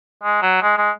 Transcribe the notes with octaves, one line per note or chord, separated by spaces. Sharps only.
G#3
F#3
G#3
G#3